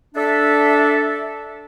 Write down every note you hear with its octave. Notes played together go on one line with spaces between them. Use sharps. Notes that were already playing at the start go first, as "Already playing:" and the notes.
D4 A4 E5